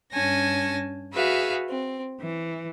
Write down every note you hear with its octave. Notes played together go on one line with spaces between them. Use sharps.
G2 C#4 G#5 A5 A#6
F#4 G#4 B4 E5 F5
C4
E3